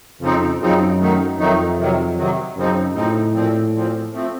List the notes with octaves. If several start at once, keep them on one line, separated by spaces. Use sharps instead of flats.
F2 C#3 F3 C4 D#4
F#2 C#3 F3 C4 D#4
D#3 F#3 A3 D#4
F2 D#3 F#3 A3 D#4
C3 D#3 F#3
C3 D#3 F#3
F#2 C#3 F3 C4 D#4
A2 C#3 F3 C4 D#4
A#2 F3 C4
A#2 F3 C4
F3 A3 C4